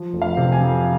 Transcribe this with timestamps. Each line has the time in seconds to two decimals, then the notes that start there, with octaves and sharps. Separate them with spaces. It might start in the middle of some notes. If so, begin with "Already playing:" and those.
Already playing: F3
0.13 F1
0.22 F5
0.37 C3
0.52 G#5
0.60 F2